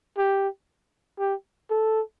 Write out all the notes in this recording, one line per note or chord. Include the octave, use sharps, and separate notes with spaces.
G4
G4
A4